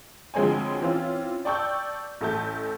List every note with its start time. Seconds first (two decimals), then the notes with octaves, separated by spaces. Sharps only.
0.34 D2 F3 G#3 C4 C#5 G#5
0.81 E3 C4 C#4 F4
1.45 D5 G5 A5 C#6 E6 G6
2.21 A1 A3 A5 G6